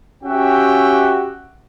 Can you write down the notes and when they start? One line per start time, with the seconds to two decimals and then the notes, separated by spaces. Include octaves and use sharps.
0.24 C#4 F#4 G4 E5 G5